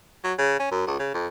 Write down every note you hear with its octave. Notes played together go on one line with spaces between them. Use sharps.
F#3
C#3
C#4
F#2
C#2
C#3
F2